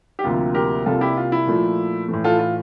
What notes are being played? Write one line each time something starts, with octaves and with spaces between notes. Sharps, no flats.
G4
D2 C3 F3 A#3 F4
G4 A#4
C2 C3 G3 A#3 F4 A4
E4 G4
F4
E4
A#2 F3 A3
A2 E3 A3
F4 A4
F4